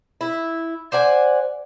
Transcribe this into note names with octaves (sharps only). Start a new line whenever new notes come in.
E4
C5 D5 F#5 G#5